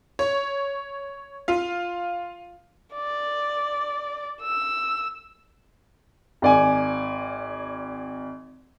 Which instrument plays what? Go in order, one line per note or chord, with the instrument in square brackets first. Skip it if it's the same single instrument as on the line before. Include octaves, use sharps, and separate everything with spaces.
[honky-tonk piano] C#5
F4 F5
[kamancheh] D5
E6
[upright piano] G#1 D5 G#5